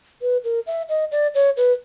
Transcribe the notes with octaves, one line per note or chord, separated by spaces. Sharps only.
B4
A#4
E5
D#5
D5
C#5
B4